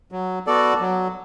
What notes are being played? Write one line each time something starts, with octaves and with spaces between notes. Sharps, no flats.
F#3
B3 F#4 A4 D5
F#3